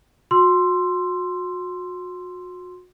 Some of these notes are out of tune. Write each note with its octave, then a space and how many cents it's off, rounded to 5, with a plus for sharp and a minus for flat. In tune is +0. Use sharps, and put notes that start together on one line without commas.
F#4 -35 C6 +0 E6 +25